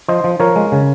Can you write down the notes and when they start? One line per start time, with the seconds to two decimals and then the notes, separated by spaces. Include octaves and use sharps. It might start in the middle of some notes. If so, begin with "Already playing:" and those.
0.08 F3 C5 D#5
0.24 F3
0.40 F3 A#4 C#5
0.56 G#3
0.72 C#3